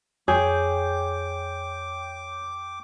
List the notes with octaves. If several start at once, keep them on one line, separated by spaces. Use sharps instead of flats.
F2 G#4 C#5 G5 D6 G6